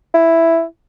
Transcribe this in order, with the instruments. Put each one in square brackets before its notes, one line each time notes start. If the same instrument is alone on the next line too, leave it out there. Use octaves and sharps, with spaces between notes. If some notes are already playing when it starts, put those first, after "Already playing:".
[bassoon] E4